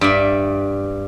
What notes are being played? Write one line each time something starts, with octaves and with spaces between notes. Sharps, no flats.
G2 D5 E5